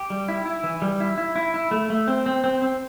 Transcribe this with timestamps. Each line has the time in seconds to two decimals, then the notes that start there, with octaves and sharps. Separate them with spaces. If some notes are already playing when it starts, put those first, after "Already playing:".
Already playing: G4
0.10 G3
0.28 E4
0.46 E4
0.63 E3
0.82 G3
1.00 E4
1.18 E4
1.36 E4
1.54 E4
1.71 A3
1.90 A3
2.08 C4
2.26 C4
2.44 C4
2.62 C4